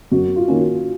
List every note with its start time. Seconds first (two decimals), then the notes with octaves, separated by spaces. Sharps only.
0.12 F#2 F#4
0.36 F4
0.48 D#3 A#3 C#4
0.60 F#4